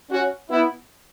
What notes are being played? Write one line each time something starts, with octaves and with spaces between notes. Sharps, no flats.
C#4 F#4
B3 E4